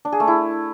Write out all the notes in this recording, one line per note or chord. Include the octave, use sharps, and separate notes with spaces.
D4
G#4
A3
E4